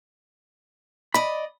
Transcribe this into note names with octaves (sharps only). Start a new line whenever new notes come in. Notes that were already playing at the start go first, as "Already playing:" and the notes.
D5 D#5 B5